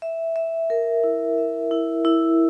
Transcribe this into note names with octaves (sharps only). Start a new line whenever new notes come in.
E5
E5
A#4
E4
E5
E4
E4